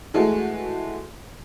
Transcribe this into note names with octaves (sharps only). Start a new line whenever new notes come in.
E3 G#3 A3 F#4